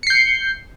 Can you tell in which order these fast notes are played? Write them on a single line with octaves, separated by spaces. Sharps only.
C#7 C7 G6